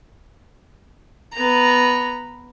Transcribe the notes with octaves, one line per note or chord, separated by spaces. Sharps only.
B3 A#5